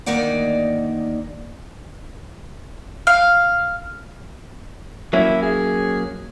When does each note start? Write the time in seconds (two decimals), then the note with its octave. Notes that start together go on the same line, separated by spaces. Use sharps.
0.06 D2 D#3 A#3 D#4 D5 F#5
3.07 F5
5.13 F#3 A#3 C#4 E4
5.42 G#4